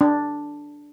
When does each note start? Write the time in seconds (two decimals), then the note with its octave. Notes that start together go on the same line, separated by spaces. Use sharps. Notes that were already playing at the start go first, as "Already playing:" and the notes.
0.01 D4